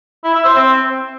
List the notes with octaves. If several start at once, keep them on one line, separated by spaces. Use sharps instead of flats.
E4
E5
C5
C4